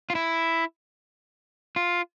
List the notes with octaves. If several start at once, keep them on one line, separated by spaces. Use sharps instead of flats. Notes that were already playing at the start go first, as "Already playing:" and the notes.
F4
E4
F4